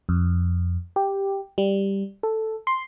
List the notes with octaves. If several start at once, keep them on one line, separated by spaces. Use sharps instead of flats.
F2
G4
G3
A4
C6